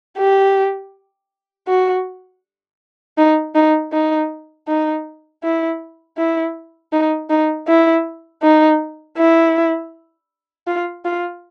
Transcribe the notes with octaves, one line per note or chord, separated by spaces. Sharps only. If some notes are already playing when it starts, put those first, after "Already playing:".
G4
F#4
D#4
D#4
D#4
D#4
E4
E4
D#4
D#4
E4
D#4
E4
F4
F4